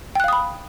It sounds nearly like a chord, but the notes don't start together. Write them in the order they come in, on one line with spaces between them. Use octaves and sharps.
G5 F#6 F5 D#6 B5